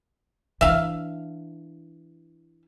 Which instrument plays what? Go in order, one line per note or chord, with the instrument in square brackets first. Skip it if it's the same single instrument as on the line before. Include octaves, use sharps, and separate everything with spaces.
[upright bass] E3 D4 [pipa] E5 F5